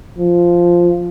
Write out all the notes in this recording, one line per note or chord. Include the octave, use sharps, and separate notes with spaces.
F3